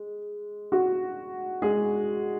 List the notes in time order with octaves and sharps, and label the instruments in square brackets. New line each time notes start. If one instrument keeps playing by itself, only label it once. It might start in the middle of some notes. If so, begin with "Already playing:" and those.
Already playing: [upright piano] G#3
F#4
G#3 G#4